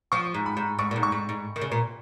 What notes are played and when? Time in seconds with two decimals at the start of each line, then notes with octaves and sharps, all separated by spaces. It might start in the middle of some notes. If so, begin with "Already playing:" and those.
0.12 F3 C#6
0.34 G#2
0.46 B5
0.57 G#2
0.79 G#2 C#6
0.91 A#2
0.96 G#2
1.03 C#6
1.12 G#2
1.29 G#2
1.56 D#3
1.61 C#3
1.72 A#2